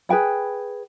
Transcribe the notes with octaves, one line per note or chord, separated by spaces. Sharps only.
G#4 B4 G5 B5